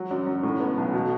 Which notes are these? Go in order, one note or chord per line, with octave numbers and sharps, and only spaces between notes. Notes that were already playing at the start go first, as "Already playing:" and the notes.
Already playing: F#3
F#2
F#2
A2
B3
B1
B2